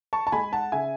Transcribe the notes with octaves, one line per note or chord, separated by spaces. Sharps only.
A5 C#6
A5
G#3 G#5 B5
F#5 A5
C#3 E5 G#5